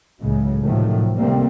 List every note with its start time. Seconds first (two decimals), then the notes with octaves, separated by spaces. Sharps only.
0.21 C#2 A2 C#3 F#3 G#3
0.63 A2 C3 D#3 F3 F#3 A3
1.17 C3 D#3 G3 A3 A#3 C4